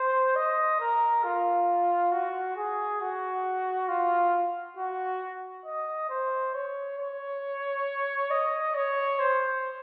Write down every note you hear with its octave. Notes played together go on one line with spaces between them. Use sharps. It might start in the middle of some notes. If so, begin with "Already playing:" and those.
Already playing: C5
D#5
A#4
F4
F#4
G#4
F#4
F4
F#4
D#5
C5
C#5
C#5
D#5
C#5
C5